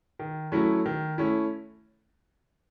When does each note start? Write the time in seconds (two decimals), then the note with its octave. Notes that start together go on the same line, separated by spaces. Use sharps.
0.19 D#3
0.52 F#3 A3 C#4 E4
0.86 D#3
1.18 A3 C#4 E4